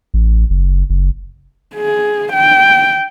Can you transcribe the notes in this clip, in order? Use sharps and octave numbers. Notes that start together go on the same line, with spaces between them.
A1
F#1
F#1
G#4
G5